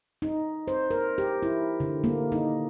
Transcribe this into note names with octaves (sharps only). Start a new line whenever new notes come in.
D#4
C5
A#4
G4
E4
D3
A#3
D#4